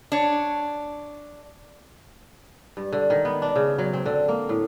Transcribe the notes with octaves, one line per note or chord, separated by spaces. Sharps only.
D4 C#5
G2
D3
D#3
B3
D4
C#3
F#3
C4
D3
A#3
A2